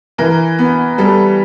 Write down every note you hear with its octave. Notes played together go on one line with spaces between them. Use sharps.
E3 A#4
B3
G3 A4